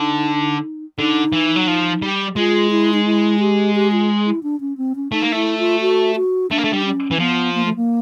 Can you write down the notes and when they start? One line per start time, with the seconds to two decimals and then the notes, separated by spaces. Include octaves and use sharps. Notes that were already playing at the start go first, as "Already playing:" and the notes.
Already playing: D3 D#4
0.99 D3 D#4
1.33 E3
1.56 F#3
1.68 F3
2.02 G3
2.36 G#3 F4
2.71 E4
2.94 D#4
3.05 E4
3.40 G4
3.75 G4
3.92 F4
4.26 E4
4.43 D4
4.60 C#4
4.77 C4
4.96 C#4
5.12 A3 D#4
5.22 A#3
5.32 A3 E4
5.59 F4
5.81 F#4
6.16 F#4
6.51 A3 D4
6.58 A#3
6.64 A3
6.73 G3
6.85 C#4
7.11 E3
7.19 F3 B3
7.55 A#3
7.65 A3
7.76 A#3